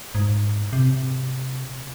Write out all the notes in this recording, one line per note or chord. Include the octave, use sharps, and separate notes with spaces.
G#2
C3